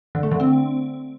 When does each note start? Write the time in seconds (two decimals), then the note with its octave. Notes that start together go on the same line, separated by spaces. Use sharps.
0.15 D3
0.23 A3
0.31 D3
0.40 C4